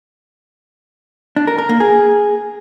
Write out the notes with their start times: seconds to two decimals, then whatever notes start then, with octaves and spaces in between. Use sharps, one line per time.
1.36 D4
1.47 A#4
1.58 A#4
1.69 A#3
1.80 G#4